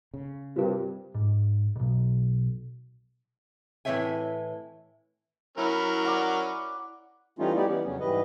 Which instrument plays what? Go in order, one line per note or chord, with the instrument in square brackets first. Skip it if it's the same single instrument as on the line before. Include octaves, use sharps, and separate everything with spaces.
[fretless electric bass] C#3
[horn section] G2 [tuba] C3 [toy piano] F4 A#4
[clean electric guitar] G#2
B1 G#2
[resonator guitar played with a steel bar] A2 E3 C4 C#5 E5 G#5
[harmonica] F#3 C#4 A#4 [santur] E4 B5
[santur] D5 F#5
[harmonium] E3 G3 A3 C#4 D#4 F4
G3 B3 D#4 E4 G4 D5
E3 B3 C#4
F2 C#3 F#3 C#4
G#2 E3 G3 B4 D#5